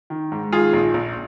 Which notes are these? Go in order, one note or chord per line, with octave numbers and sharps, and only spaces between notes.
D#3
G#2
D#3 F4 G#4
A#1
A#1